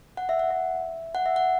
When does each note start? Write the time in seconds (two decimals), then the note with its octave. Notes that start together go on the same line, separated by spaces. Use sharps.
0.17 F#5
0.29 E5
0.39 F#5
0.51 E5
1.15 F#5
1.26 E5
1.36 F#5